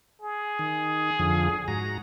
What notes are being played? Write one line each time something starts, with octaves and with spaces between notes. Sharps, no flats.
G#4
D#3
F2 D3 F3
G#2 F#4 A#5